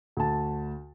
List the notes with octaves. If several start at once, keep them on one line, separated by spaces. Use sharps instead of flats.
D2 A5